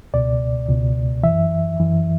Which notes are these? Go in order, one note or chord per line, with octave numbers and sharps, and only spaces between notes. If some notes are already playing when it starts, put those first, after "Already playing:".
C#2 B2 D5
C#2 B2
E3 E5
F#2
F#2 E3